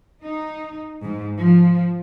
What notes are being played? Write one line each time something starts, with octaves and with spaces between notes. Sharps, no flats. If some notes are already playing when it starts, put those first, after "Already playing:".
D#4
G#2
F3